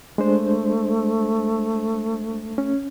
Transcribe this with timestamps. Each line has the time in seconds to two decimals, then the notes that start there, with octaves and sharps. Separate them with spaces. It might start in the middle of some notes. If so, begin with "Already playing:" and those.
0.18 G#3 A3 D4 C5
2.58 C#4